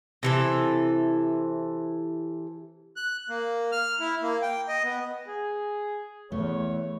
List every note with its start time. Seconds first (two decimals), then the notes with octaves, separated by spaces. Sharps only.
0.23 C3 E3 A4
2.96 F#6
3.29 A#3
3.72 F6
4.00 E4
4.22 A#3
4.42 G5
4.68 D#5
4.84 B3
5.27 G#4
6.32 E2 A3 C#5